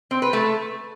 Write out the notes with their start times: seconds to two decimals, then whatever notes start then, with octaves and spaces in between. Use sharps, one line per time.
0.11 C4
0.22 B4
0.33 A3